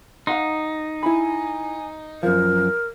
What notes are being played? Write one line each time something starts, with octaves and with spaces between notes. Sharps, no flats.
D#4 F5 F#5 C6
E4 G#5 B5
F#2 F3 A#4